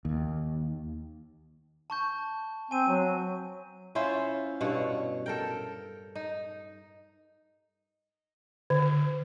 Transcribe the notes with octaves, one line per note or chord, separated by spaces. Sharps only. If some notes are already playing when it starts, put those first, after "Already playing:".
D#2
A5 C#6 G6
C4 G#5 D#7
F#3
C#4 E4 F4 C5
G2 B2 C#5 F#5
A4 A#4 G5
D#4
D3